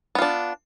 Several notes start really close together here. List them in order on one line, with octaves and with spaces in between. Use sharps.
B3 F4 D4